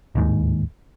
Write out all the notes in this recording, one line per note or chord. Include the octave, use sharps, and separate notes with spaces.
D1 D#2 G#2